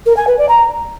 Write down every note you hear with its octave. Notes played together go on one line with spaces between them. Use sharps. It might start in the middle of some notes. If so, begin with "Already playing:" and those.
A#4
G#5
B4
D5
A#5